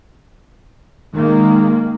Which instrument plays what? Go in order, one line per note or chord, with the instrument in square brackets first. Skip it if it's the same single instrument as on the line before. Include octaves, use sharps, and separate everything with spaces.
[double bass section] D#3 G#3 A#3